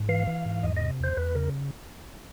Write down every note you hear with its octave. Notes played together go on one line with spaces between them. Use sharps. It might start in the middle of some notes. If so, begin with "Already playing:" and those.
Already playing: G#2
E3 F5
E3
G#2
E2 D#5
C3 D#5
E2 C5
E2 B4
C#3 A#4